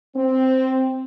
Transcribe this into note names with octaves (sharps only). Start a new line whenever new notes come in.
C4